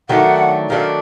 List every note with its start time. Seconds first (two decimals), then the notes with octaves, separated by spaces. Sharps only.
0.09 D#3 F#3 A3 D4 F#5
0.70 D#3 F#3 A3 D4 F5